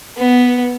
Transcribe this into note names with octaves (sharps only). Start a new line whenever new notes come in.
B3